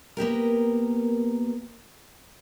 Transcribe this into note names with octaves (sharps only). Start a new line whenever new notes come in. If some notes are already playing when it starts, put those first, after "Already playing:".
A#3 B3 G4 A#4